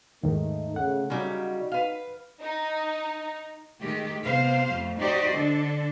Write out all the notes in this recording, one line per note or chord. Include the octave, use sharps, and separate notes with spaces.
D#2 G#2 D#3 A3 D#4
C#3 A3 F#5
C#3 F#3 G3 D#4 F#4
B4 F5
D#4
D#3 G#3 A3 G4
C3 B3 C5 F5
F2 A3
D#4 F#4 G4 C5 D5 D#5
D3 D4 A4